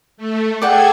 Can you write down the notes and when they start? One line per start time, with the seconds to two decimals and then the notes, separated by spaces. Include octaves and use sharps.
0.17 A3
0.62 G#4 A4 D5 F#5 G5 G#6